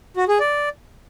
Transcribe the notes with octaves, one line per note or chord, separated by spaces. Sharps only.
F#4
G#4
D5